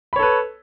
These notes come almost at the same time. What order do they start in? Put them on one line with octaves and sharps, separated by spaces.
B5 C#5 A4 B4